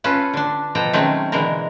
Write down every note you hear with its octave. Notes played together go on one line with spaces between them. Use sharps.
C#4 F4 A4 B4
D3 D4
B2 F3 A4 G5 A#5
D#3 F#3 G#3 A3 C4 C#4
B2 D3 E3 G#3 A#4